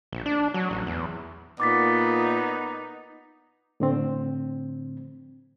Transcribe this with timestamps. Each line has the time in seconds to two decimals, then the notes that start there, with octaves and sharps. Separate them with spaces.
0.13 A#1
0.26 D4
0.54 F#3
0.71 A1
0.87 E2
1.60 A#2 B3 D#4 D6 A6 B6
3.80 A2 D3 C4